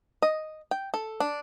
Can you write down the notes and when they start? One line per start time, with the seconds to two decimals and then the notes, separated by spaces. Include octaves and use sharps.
0.22 D#5
0.71 G5
0.94 A4
1.20 D4